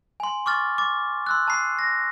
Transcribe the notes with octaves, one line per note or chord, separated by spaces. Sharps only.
G#5 C6
C#6 D6 F6 A6
D6 A6
C6 E6 F#6
A5 B5 C7
A#6 C7